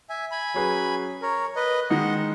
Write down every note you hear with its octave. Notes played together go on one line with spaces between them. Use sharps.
E5 G#5
G#5 B5
F#3 C#4 G#4 B4
A#4 C#5
B4 D#5
D#3 G#3 D#4 D#5 F#5